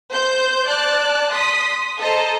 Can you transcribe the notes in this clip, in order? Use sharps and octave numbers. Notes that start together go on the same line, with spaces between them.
C5 G6
D5 A5 F#6
C6 D#6 B6
A4 C5 D#5 A#5